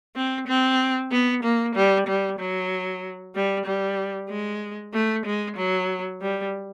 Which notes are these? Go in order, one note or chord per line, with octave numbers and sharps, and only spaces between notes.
C4
C4
B3
A#3
G3
G3
F#3
G3
G3
G#3
A3
G#3
F#3
G3